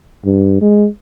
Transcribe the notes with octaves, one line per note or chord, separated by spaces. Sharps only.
G2
G#3